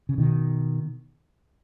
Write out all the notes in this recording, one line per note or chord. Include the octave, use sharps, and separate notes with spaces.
C#3
B2 D#3